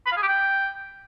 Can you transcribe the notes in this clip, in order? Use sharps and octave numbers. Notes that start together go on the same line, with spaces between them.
B5
F5
G#4
G4
G5